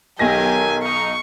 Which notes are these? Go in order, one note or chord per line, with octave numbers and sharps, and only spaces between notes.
B1 D#3 F#3 G4 G#5 A#6
D#4 C#6